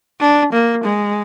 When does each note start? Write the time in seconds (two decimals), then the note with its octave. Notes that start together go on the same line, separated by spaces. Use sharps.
0.21 D4
0.53 A#3
0.84 G#3